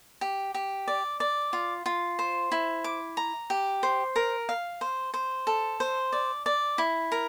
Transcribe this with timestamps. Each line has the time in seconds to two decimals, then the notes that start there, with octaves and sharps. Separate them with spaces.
0.21 G4
0.54 G4
0.88 D5
1.20 D5
1.53 F4
1.86 F4
2.19 C5
2.52 E4
2.84 D6
3.17 A#5
3.50 G4
3.83 C5
4.16 A#4
4.49 F5
4.81 C5
5.14 C5
5.47 A4
5.80 C5
6.12 D5
6.46 D5
6.78 E4
7.12 A#4